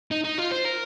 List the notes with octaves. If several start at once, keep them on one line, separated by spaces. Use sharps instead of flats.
D#4
D#4
F4
C5
A#4